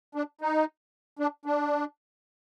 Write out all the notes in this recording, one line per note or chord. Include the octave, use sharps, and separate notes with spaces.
D4
D#4
D4
D4